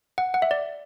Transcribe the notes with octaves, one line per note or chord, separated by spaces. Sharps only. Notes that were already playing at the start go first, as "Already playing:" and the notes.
F#5
F#5
E5
D5